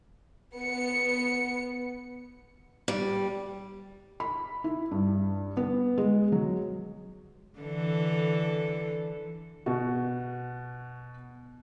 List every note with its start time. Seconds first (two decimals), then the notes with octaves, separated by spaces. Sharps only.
0.54 B3 C#7
2.88 G3
4.20 B5
4.64 E4
4.91 G2
5.57 B3
5.98 G#3
6.32 F#3
7.59 D3 E3 A4
9.66 B2 F#4